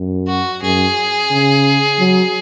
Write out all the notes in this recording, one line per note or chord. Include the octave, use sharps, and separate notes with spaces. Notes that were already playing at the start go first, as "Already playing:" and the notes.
Already playing: F#2
F#4
F#2 G#4
C#3
F#3